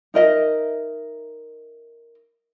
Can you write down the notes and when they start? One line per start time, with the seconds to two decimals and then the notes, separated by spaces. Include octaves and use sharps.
0.14 D#4 A#4 D#5 E5